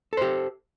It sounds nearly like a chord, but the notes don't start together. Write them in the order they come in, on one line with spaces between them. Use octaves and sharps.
A4 C5 G4